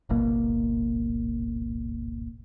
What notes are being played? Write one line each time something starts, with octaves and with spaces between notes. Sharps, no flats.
D1 G#1 B2 A#3